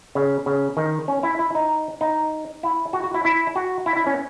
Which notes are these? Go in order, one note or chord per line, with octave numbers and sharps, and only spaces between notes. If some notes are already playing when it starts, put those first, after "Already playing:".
C#3
C#3
D#3
C#4
E4
E4
D#4
D#4
E4
F#4
F#4
E4
E4
F#4
E4
E4
C#4